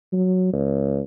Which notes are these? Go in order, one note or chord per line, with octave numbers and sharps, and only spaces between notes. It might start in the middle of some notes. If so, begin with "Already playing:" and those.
F#3
C#2